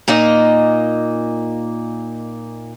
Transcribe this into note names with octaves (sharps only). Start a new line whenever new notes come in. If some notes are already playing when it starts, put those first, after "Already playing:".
A#2 A#3 D#4 D#5